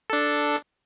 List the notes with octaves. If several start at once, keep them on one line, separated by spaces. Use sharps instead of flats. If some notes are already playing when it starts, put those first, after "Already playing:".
D4 A4